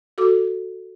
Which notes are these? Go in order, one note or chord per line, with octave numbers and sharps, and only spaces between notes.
F#4 A4 D6